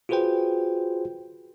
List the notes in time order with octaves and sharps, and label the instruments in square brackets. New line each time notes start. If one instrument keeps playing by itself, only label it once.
[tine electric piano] F4 F#4 G#4 B4 C5 G5